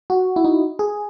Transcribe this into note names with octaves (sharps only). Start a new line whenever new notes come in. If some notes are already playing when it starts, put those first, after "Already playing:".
F#4
E4
D#4
G#4